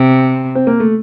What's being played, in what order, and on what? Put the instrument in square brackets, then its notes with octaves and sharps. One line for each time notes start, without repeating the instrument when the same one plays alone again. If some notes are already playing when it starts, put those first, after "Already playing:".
Already playing: [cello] C3
[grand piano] C4
A#3
A3